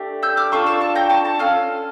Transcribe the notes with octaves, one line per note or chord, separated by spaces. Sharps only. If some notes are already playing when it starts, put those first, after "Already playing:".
Already playing: A3 D4 G4
E6 G6
D6 F6
D4 F4 A4 C#6 E6
C#6 E6
A5 C#6
G5 A#5
A5 C#6
A5 C#6
C#4 F4 A4 F6